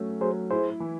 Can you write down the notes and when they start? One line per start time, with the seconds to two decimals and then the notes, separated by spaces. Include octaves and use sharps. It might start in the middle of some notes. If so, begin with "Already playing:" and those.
Already playing: F#3 A3 C#4
0.21 F#3 G#4 C5
0.51 E4 G#4 C5
0.80 E3